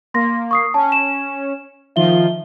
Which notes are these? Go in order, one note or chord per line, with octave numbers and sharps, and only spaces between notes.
A#3 C6 A#6
C#6 D#6 C7
C#4 A5
E7
D#3 F3 F4 E5 G7